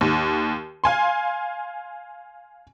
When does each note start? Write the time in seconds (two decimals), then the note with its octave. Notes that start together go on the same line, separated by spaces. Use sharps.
0.01 D#2
0.84 F5 G#5 C6